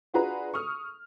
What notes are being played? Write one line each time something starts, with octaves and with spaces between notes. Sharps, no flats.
D4 F4 F#4 G#4 B4 A#5
C#6 D#6 F6